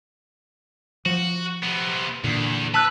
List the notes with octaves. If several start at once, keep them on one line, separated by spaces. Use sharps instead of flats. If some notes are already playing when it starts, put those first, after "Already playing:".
F3 F#4
C3 B3
E2 A#2 D3
B4 A5 E6 F#6